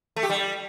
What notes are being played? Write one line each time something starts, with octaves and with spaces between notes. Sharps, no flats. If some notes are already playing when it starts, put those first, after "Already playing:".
A3
G4
G3